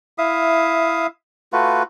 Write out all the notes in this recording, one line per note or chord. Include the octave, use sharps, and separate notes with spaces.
E4 E5 F5 D#6
A3 F4 F#4 B4